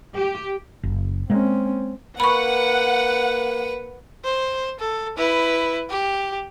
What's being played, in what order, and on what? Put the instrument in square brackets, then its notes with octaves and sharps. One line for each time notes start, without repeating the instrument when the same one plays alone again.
[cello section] G4
[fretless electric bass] F#1
[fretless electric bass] G#3 A#3 [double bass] C4 C#4
[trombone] A#3 [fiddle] B4 [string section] F#5 [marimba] B5 C#6
[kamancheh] C5
A4
E4 B4
G4